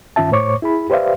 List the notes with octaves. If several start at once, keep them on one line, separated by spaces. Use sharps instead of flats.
G2 D#3 C#4 F4 E5 A5
A2 C5 C#5 C#6 D6
E4 G#4 B5
G4 B4 C5 D5 E5 F5